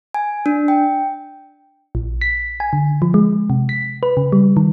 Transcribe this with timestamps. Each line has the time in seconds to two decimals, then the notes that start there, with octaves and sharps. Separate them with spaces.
0.14 G#5
0.46 D4
0.68 G5
1.95 A#1
2.21 B6
2.60 G#5
2.73 D3
3.02 F3
3.14 G#3
3.50 C3
3.69 B6
4.03 B4
4.17 C#3
4.32 G3
4.57 D#3